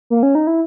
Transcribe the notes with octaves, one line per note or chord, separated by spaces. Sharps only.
A#3
C#4
D#4
E4